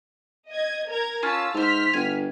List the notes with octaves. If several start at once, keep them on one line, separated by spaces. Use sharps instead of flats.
D#5 G#6
A#4 A#5 G#6
C#4 F4 C#5 A5 E6
G#2 C5 E5 F6 B6
G1 G#5